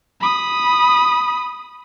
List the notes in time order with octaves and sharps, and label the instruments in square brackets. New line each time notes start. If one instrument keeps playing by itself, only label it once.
[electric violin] B5 D#6